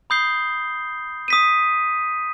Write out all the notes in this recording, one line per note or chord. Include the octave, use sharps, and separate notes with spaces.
B5 D#6 G6 C7 G7
D#6 B6 D#7